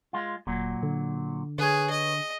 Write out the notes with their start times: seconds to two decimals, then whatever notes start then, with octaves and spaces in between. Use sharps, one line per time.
0.13 G#3 F4
0.47 D#1 A#2 F#3
0.83 D3
1.59 D3 G#4 B4 C#5
1.90 D#5